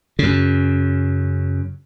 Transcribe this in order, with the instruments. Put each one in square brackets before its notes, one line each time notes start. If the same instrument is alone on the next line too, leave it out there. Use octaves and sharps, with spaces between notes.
[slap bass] F#2 C#3